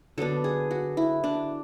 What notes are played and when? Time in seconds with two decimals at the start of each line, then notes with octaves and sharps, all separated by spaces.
0.18 D3 F#3 B3 D4 A4
0.44 G#4
0.71 F#4
0.97 E4
1.24 D4